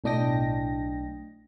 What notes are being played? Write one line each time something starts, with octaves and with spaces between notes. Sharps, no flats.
B1 A2 D4 D#5 G5 A#6